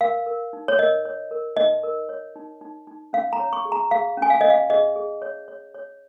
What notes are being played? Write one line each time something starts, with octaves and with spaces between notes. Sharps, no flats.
A#4 F5
A#4
D#4
C#5
A#4 D#5
C#5
A#4
D#4 D#5
A#4
C#5
D#4
D#4
D#4
C#4 F5
A#5
C#5
C#6
G#4
A#5
G#4 F5
C#4 G#5
F5
C#4 D#5
F5
G#4 D#5
G#4
C#5
C#5
C#5